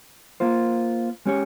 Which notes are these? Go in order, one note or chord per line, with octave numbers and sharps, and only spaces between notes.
A#3 F4 C5
G#3 C#4 G4 C#5